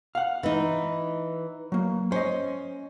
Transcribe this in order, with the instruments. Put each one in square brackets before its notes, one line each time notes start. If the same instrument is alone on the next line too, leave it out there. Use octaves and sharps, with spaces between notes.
[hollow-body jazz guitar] F5 F#5
[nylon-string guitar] E3 D#4
[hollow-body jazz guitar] F#3 A#3
[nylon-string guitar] C#4 [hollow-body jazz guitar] C5 D#5